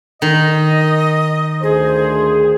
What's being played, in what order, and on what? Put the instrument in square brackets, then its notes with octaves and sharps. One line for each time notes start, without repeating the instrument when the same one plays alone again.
[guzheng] D#3 [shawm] D#5
[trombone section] D2 C5 [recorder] G#4